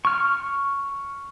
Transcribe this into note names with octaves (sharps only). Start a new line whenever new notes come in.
C#6 F6